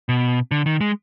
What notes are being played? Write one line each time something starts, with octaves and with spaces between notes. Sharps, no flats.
B2
D3
D#3
G#3